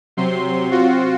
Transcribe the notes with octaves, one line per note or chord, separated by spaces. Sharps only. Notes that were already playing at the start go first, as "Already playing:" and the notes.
C3 F#3 C4 C6
C4 F4 F#4